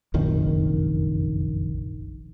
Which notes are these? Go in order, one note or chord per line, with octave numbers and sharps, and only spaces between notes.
F1 A#1 F#2 D#3